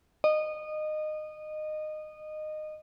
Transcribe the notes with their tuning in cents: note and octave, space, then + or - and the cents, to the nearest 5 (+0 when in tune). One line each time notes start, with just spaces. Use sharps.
D#5 -20